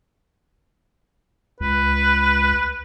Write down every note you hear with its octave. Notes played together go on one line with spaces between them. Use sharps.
C#2 B4